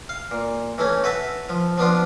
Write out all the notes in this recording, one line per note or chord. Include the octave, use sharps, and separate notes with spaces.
F5
A#2
E3 A3 C#4
F#4 B4 E5 A5
F3
F3 B3 D4 F4